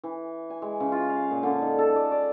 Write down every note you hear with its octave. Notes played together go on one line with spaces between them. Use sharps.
E3
G#5
G#3
C#3
F4
F5
A#2
D3
D#4
A4
D5
D5